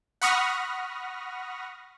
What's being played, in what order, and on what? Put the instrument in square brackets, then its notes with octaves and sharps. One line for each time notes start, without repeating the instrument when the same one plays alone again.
[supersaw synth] F#5 B5 C#6 D#6 F6 A#6